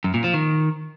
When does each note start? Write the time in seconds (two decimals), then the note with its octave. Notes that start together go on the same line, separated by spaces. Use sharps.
0.04 F#2
0.14 A#2
0.24 F3
0.34 D#3